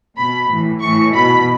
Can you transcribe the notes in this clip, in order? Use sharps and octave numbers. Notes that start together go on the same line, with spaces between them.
B2 B5
A2 E3
A2 E3 C#6
B2 B5